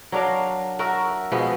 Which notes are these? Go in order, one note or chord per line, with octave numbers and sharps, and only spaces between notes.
F#3 D4 A#4 F5
F#4 A#4 E5
B2 F3 G#3 B3